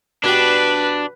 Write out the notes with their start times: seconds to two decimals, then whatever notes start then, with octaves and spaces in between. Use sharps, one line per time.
0.24 B2 D4 G4 B4